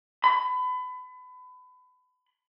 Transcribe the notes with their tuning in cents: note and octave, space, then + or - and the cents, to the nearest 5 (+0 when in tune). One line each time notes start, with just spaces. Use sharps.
B5 +30